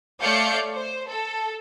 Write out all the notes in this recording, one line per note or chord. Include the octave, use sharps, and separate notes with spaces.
A3 C#5 D5 F5 G6 C#7
C5
A4